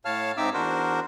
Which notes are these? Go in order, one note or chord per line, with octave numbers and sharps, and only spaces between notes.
A2 C#5 F5 A5 F6
G#2 C4 D#4 E5 D6 E6
E2 D4 F#4 A#4 C5